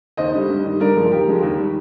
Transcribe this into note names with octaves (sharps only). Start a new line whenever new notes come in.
D#2 C5 D#5
D3 G3
G2
D#3 G3
G2 A#4 D5
F3 G#3
D#2 G4 A#4
D3 F3 G#3
D#2
D#3 G3